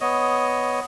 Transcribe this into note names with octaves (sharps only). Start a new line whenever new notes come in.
B3 C#5 D#5